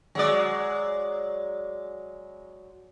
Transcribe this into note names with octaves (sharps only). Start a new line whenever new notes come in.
F#3 G#3 D5